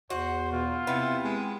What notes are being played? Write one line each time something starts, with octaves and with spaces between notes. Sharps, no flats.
E2 F#4 C5
B2 F4
C3 B3 C4 E4
G#3